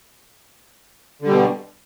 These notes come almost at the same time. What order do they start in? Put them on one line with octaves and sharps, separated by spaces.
D3 G3 B2